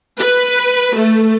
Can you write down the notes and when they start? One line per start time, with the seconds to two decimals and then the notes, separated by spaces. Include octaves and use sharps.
0.19 B4
0.95 A3